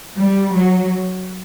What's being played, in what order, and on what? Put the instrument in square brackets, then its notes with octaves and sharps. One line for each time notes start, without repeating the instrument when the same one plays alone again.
[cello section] G3
F#3